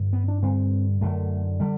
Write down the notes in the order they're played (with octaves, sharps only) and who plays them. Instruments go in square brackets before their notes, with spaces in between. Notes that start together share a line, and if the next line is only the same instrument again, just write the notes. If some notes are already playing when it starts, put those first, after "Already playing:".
Already playing: [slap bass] G2 D3
B3
D4
G2 D3 C4
F#2 D3 A3
D3 G3